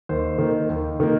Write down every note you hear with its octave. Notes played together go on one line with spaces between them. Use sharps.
D#2 C5
D#3 A#3
D#2
D#3 A#3